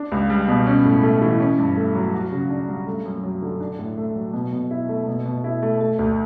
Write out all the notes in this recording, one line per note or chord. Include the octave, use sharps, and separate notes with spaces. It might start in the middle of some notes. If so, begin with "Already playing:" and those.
Already playing: D4
C#2
G3
B2
C#4
A2
A3
E3
C#4
G2
A3
F#3
F#4
C#3
D4
G3
A3
F#2
F#3
D3
D4
A2
A3
F#3
B2
B2
E4
A3
B2
B2
E4
A3
A3
D2